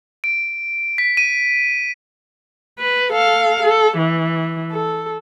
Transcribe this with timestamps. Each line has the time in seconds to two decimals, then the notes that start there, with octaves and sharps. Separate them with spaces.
0.24 D7
0.98 B6
1.17 D#7
2.79 B4
3.12 A4 F5
3.62 A4
3.98 E3
4.71 A4